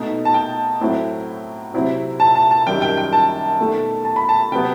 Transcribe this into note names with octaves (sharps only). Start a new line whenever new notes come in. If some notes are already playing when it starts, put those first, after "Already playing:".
Already playing: B2 A3 D#4
A5
G5
A2 F#3 C4 E4
C3 F#3 C4 E4
A5
A5
A5
F#2 D#3 G3 G5
G5
G5
A5
B2 A3 D#4
A5
B5
A5
C3 F#3 B3 G5